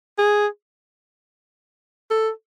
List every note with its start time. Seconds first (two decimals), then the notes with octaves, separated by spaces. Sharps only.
0.18 G#4
2.11 A4